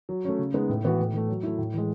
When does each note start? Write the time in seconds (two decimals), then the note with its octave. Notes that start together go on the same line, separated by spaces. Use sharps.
0.09 F#3
0.25 A3 C#4
0.38 C#3
0.54 G#3 B3 D#4
0.69 A2
0.84 E3 B3 F#4 B4
0.99 A2
1.14 E3 A3
1.29 F#3
1.43 A3 E4
1.58 A2
1.74 E3 G#3